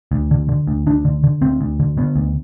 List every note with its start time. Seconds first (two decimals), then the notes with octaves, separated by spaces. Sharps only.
0.12 D2
0.31 D3
0.49 D3
0.67 D2
0.87 D2 D4
1.05 D3
1.24 D3
1.41 D2 C4
1.61 D2
1.80 D3
1.97 D3 B3
2.16 D2